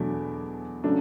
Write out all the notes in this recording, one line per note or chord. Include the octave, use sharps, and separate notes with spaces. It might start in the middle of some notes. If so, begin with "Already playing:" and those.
Already playing: E2 B2 F#3 A3 D4
C#3 F#3 A3 D4